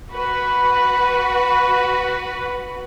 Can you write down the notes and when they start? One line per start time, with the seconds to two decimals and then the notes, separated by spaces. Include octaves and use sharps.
0.11 F#4 B4